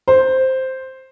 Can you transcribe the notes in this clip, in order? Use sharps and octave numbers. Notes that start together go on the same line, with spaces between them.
C5